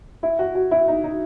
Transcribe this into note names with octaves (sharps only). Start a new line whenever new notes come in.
E4
F#4
F#4
E4
D#4
D#4